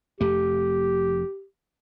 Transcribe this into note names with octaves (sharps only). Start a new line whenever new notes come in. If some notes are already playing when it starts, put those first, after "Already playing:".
F1 F2 A3 G4